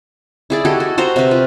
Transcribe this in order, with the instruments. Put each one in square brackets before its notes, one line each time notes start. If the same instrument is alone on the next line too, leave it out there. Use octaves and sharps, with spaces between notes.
[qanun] E4 G#4 D5
F#4 G4 A4 D#5
F#4
F#4 C5 A#5
C3 B4
F4